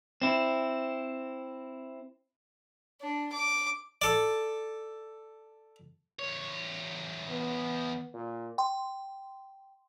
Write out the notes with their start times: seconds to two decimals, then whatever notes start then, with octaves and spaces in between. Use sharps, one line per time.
0.22 C4 E4
3.01 D4
3.32 D6
4.02 A4 D5
6.19 E2 C#5
7.29 B3
8.14 A#2
8.58 G5 C6